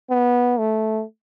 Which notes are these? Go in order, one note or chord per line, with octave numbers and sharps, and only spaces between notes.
B3
A3